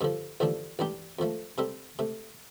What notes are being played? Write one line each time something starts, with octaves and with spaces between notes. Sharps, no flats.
G2 D3 F3
A1 G2 D3 F3 D4
A1 G2 G3 D4 G4
F2 F3 A3
C3 G3 C4 A4
C3 A3